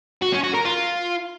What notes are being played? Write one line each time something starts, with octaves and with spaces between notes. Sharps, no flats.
F#4
C#4
F#4
A#4
F4